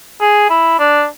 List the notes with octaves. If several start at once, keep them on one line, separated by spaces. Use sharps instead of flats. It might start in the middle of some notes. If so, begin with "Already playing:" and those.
G#4
E4
D4